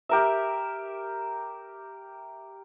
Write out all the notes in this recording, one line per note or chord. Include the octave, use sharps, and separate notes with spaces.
G4 A#4 E5